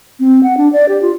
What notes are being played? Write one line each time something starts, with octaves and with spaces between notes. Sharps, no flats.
C4
F#5
D4
D5
G4
F4